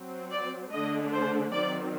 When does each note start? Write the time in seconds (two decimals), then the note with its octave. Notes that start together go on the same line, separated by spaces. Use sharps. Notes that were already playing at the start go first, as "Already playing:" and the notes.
Already playing: F#3 C4
0.32 D5
0.72 D3 A3 D4 D#5
1.12 C5
1.52 D#3 F#3 C4 D5